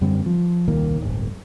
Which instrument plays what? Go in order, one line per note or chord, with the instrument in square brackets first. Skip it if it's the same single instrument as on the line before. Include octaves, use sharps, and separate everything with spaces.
[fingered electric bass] F#2 D3 G3 C4
F3
D#1 C2 D#3 A#3
D1 G1